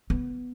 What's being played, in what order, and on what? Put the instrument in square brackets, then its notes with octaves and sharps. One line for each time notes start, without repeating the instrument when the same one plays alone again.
[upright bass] B3